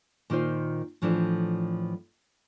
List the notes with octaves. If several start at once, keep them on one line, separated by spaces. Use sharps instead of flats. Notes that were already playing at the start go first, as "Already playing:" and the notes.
A#2 D#3 D#4 F4 C5
A2 E3 F3 D4 A4 C5